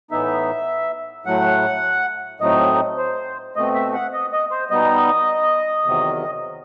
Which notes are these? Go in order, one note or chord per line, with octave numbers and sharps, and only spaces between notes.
A2 E3 B3 D#4 E5
A2 F#3 A3 F#5
A2 F#3 A3 C4 D#4 D#5
C5
B2 A3 C4 D#5
E5
F#5
D#5
D#5
C5
B2 G3 B3 D#4 D#5
E2 C3 D#3 F#3